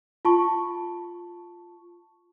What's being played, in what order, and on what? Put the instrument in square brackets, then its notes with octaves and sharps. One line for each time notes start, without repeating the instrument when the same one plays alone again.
[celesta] F4 A5 C#6